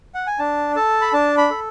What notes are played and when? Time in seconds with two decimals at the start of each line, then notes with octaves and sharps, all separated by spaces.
0.15 F#5
0.27 G#5
0.39 D4 A5
0.76 A4 A5
1.01 B5
1.13 D4 A5
1.38 B5
1.50 A4